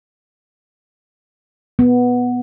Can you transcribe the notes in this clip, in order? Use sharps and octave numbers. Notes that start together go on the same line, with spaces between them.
B3